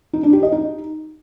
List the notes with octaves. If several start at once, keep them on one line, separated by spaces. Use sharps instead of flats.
D#4
D4
G4
D#5
D#4